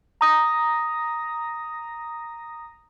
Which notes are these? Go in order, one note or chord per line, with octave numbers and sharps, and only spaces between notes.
A#5 D#6 A#6